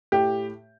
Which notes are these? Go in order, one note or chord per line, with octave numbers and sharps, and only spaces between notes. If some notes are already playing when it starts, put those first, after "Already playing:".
A2 G4